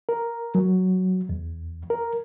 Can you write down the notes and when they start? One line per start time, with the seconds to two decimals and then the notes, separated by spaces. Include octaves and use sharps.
0.09 A#4
0.55 F#3
1.29 E2
1.90 A#4